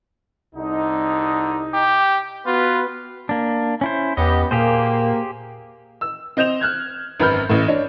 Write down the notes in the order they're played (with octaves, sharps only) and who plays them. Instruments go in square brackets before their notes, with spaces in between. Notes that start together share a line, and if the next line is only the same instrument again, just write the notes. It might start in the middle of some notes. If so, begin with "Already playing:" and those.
[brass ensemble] C2 D#4 [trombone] D3
[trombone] G4
[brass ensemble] B3 F#4 B4 [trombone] F4
[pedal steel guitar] A#3 D4
C#4 E4 C5
[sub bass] E2 [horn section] B3 C#4 G4 [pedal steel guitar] D#5
[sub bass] A#2 [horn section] A#3 [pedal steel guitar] G4 G#4 C5
[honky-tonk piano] E6
C4 D#5 G6 E7 F7
F6 F#6 G#6
G#1 F#2 B4 B5 F6 G6
A1 A2
D4 C#5